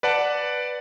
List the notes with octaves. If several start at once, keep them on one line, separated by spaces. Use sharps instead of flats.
B4 D5 F#5 A5